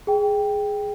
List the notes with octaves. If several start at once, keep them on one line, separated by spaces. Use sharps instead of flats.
G#4 G5